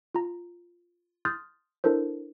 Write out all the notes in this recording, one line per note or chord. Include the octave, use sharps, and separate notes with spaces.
F4 A#5
C6 D#6 F6 G6 A6
D4 E4 A4 A#4 C5